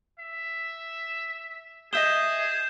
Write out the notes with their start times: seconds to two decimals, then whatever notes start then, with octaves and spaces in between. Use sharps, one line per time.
0.19 E5
1.93 G#4 D#5 E5 D#6 G6 E7 G7